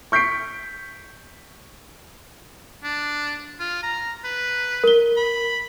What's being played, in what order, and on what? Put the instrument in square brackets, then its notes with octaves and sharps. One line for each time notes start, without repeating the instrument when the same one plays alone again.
[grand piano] C#6 G6 B6 C7 D7
[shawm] D4
F4
A#5
B4
[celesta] A#4 G7
[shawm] B5